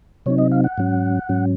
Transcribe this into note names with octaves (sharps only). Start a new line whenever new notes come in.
C3 F#3 C4 D#4 C#5
D#5
F5
F#5
G#2 F#3 C#4
G#2 F#3 C#4